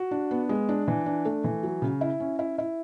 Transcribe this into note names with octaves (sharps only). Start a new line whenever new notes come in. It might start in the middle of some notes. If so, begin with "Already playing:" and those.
Already playing: F#4
D4
B3
G#3
D4
E3
D4
A3
E3
F#3
C#3
E4
C#4
E4
E4